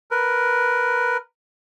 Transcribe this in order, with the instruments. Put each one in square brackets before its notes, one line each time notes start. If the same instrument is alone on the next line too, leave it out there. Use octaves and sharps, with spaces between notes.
[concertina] A#4 B4